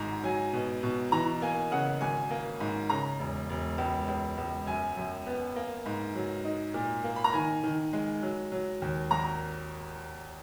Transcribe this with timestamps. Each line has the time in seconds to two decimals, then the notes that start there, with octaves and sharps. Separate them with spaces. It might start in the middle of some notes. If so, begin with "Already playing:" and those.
Already playing: G#1 G#2 A#5
0.23 F#3 G#5
0.53 B2
0.83 B2
1.12 E3 A#5
1.42 A#3 G#5
1.72 C#3 F#5
2.01 G#1 G#5
2.31 A#3
2.60 G#2
2.90 C#3 A#5
3.19 E1
3.50 E1
3.78 C#2
4.08 C#2
4.38 C#2
4.67 F#2 G#5
4.97 F#2
5.27 B3
5.56 A#3
5.86 G#2
6.15 F#3
6.45 D#4
6.74 A#2
7.04 A#3
7.16 B5
7.24 A#5
7.33 D#3 G#5
7.63 D#3
7.93 G#3
8.22 F#3
8.52 F#3
8.82 D#2
9.11 G#1 A#5